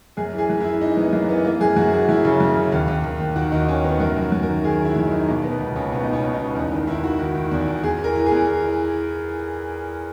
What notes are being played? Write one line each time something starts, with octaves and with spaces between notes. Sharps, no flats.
F#2 G#4
E3
G#4
F#2
E4
E3
E3 D#4
F#2 B3
F#2 A#3
E3 B3
E3 A#3
F#2 G#4
F#2 F#4
E3 G#4
F#2 E4
C#3
F#2
C#3
D#2
D#2
D#2
D#2
D#3 F#4
D#2 D#4
D#3 C#4
D#3 B3
F#2 A#4
F#2 F#4
F#2
A#4
D#3
D#3 G#4
D#3
E4
F#2
D#4
D#3
B2 A#3
B2 B3
C#2 D#4
C#2 C#4
B2 B3
D#4
B2
C#4
B2
D#4
C#2
E2 D#4
D#3
D#3 E4
D#3 F#4
D#3
D#3
E2
E2
E2 G#4
E3
A#4
E3
G#4
E2
E3
E3